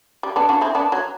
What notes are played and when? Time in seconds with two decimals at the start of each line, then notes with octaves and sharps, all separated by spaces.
0.23 G3
0.36 B3 D4
0.49 D4 F#4
0.61 C4 E4
0.75 B3 D4
0.92 F#3